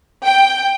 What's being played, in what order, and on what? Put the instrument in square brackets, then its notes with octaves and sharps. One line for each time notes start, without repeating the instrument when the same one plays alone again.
[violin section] G5